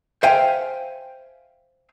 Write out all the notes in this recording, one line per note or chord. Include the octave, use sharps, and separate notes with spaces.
C5 E5 F5 G5 G#5